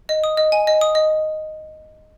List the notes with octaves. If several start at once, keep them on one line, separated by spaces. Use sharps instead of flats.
D#5
D#6
D#5
G#5
D#5
D#6
D#5